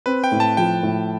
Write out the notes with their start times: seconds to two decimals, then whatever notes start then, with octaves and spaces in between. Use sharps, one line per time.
0.06 C4 B4
0.24 G5
0.32 A2
0.40 A5
0.57 F3 G5
0.83 A2